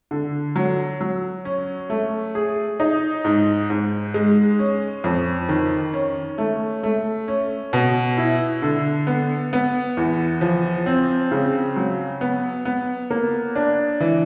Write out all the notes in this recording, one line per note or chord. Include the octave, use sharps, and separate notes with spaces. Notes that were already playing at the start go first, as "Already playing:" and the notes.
D3
F#3
F#3
C#4
A3
G#4
D#4
G#2
G#2
G#3
C#4
F2
D#3
C#4
A3
A3
C#4
B2
E4
D3
B3
B3
E2
F3
C4
C#3
F#3
B3
B3
A#3
D4
E3